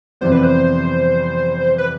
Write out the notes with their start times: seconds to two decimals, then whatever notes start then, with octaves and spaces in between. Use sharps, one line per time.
0.21 F2 C3 E3 G3 B3 C5
0.32 B4
0.43 C5
1.78 B4